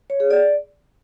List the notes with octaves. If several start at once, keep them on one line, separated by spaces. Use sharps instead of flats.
C#5
G#4
D5